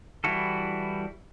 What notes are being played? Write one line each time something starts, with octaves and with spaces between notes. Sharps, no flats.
E3 G3 E4 F#4 A4